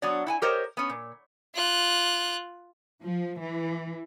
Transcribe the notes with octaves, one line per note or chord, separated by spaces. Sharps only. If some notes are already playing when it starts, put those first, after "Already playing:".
F#3 B3 D4 C#5 D5
E4 F#5 G#5
G4 A#4 C5 C#5 D#5
B3 C#4
A#2
F4 F#6
F3
E3